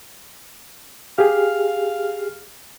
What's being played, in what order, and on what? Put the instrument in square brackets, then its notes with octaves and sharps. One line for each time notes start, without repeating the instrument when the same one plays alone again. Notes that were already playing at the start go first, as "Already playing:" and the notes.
[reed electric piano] G4 G#4 [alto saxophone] F5